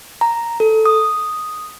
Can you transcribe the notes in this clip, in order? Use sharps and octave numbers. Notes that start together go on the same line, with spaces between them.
A#5
A4
D#6